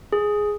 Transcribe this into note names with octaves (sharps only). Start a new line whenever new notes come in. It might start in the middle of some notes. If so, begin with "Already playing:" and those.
G#4